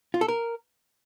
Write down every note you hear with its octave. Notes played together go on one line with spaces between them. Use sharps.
F4
A4
A#4